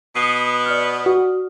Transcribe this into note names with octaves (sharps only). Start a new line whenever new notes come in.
B2 B3 D#6 C7 D#7
D5 D#6 F6
F#4